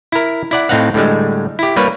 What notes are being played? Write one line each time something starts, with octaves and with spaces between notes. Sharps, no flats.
E4 A#4
E4 D5 F#5
A2 C4 D#4 F5 F#5
A2 D3 G3 G#3
E4 G4
G3 A#3 B4 C#5